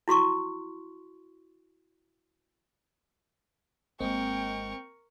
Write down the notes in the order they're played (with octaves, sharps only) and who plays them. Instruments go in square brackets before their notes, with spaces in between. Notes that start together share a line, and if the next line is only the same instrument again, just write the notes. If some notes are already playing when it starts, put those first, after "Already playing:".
[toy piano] E4 F#4 C6 C#6
[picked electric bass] G#1 G#3 [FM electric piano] A#3 C4 D#5 [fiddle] A#4 C#6 [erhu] G5